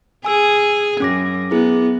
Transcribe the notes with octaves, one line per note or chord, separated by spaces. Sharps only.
G#4 G#5 E6
F#2 C#4 D6 A#6
B3 E4 G#4